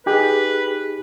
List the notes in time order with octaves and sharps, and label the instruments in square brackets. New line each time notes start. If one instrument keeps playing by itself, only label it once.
[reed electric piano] D#4 G4 G#4 [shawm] B4